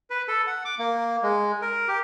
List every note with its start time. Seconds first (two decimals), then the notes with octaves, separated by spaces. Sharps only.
0.10 B4
0.28 A4
0.47 F#5
0.65 D6
0.79 A#3
1.23 G#3
1.62 A#4
1.88 G4